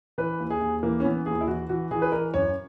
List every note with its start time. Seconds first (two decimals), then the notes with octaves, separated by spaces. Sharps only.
0.18 E3 B4
0.40 D#2
0.50 G#4
0.61 D#2
0.83 E3 A#3
1.00 C#4
1.05 E3 B3
1.26 D#2 G#4
1.41 E4
1.47 E3 F#4
1.69 E3 F#4
1.91 E3 G#4
2.02 B4
2.12 E3 A#4
2.34 F#2 C#5